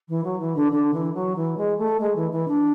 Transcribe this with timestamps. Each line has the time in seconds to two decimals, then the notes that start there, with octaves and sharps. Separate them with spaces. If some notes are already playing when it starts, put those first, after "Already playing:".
0.09 E3
0.24 F#3
0.39 E3
0.56 D3
0.72 D3
0.93 E3
1.14 F#3
1.36 E3
1.57 G#3
1.78 A3
2.00 G#3
2.16 E3
2.31 E3
2.48 D4